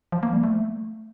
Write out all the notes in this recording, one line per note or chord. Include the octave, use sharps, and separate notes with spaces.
F3
A#3
G3
A3